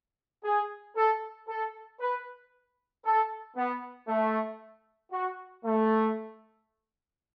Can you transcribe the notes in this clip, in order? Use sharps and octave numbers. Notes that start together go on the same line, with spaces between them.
G#4
A4
A4
B4
A4
B3
A3
F#4
A3